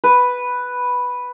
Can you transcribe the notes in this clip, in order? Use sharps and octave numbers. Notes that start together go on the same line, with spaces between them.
B4